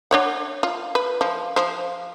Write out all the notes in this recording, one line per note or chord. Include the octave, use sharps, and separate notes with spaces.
D4 C#5 F#5
F4
B4
F3
F3 C5